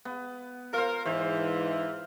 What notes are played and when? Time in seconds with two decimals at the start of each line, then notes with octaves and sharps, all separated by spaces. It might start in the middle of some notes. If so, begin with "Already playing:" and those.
0.05 B3
0.73 F4 A#4 C5
1.05 G#2 E3 C5